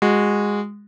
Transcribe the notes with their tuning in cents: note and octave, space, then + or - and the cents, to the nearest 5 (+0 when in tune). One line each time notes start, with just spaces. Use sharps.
G#3 -15 F#4 -15